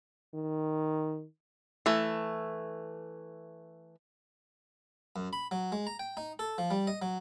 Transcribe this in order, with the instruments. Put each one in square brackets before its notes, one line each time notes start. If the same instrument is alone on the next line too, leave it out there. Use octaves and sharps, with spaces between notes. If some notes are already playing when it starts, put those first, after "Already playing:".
[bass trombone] D#3
[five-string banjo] E3 A3
[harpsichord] F#2
B5
F#3
G#3
A#5
G5
D#4
A4
F3
G3
D#5
F#3